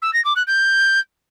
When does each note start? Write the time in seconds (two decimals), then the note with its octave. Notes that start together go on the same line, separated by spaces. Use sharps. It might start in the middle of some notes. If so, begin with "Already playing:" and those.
0.02 E6
0.13 A#6
0.25 D6
0.36 F#6
0.47 G6